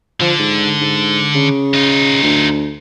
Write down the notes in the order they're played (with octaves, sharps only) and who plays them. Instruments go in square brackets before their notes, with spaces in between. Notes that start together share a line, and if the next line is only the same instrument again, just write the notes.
[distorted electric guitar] D3 [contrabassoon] F3
[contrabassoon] G#2
G#2
C#3
[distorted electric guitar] D#4 F4
[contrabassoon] D2